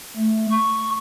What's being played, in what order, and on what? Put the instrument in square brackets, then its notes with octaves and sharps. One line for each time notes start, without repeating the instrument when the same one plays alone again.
[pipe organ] A3
C#6